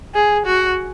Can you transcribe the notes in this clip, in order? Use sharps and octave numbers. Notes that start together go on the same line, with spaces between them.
G#4
F#4